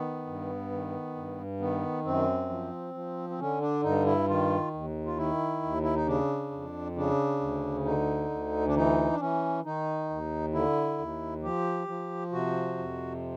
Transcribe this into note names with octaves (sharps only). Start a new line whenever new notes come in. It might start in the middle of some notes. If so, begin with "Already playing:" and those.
Already playing: D#3 B3
G2
D#3
G2
D#3 B3
F#2 C4
F3
F3
C4
D3 C#4
D4
G2 D#4
E4
D#3 F4
D#2
F4
D#3 E4
D#2
E4
D#4
C#3 D4
F2
C#3 D4
D2
D3 D#4
D2
D4
E3 D#4
D4
E3 C#4
D#3 D#4
D#2
D3 E4
D#2
F3 G4
F3
C3 F#4
F2